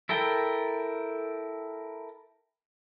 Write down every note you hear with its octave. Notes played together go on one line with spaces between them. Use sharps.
E4 A4 A#4 G5